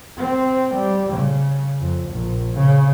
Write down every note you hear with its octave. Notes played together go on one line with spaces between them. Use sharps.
C4
G3
C#3
F2
A#1
C#3